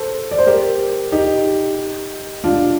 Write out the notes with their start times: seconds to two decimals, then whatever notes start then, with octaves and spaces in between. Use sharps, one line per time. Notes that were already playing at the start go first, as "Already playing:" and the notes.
Already playing: A4 C5
0.31 D5
0.38 C5
0.47 G4 A#4
1.12 D#4 G4
2.44 D4 F4